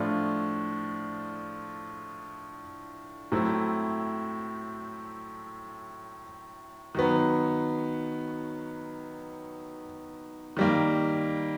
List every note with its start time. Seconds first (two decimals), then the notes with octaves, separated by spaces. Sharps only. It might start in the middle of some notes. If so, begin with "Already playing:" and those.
Already playing: A2 F3 A3 D4 F4
3.32 A2 F#3 A3 C4 E4
6.95 D#3 F#3 B3
10.57 D#3 G3 A#3